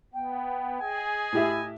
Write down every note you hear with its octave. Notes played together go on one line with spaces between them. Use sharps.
B3 G5
G#4 D#5 G#5
A2 E4 G4 E5